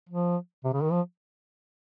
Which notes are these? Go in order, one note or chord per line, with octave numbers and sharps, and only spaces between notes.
F3
C3
C#3
D#3
F3